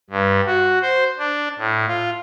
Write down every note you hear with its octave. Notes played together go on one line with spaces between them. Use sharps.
G2
F#4
C5
D4
A2
F4